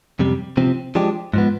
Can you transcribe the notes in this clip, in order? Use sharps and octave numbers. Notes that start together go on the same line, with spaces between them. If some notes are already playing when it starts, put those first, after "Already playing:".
F2 C3 G3
C3 F3 C4
F3 G#3 D4 G4
G#2 F3 B3